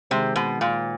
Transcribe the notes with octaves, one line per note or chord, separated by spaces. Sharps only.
C3 D#3 G#3 C4
B2
A#2